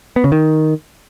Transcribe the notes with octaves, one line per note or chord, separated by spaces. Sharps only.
B3
C#3
D#3